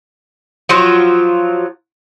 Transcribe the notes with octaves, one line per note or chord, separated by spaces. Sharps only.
F3 F#3 F4